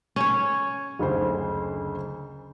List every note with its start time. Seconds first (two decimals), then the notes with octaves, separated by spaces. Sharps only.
0.16 C#4 C#5
0.99 F#1 D2 C5